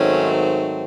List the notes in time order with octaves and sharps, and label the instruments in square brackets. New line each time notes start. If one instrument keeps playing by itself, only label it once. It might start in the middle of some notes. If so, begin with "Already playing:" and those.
Already playing: [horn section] G#2 D#3 F#3 A3 C4 C#4